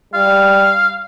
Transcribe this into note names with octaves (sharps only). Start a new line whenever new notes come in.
G3 F5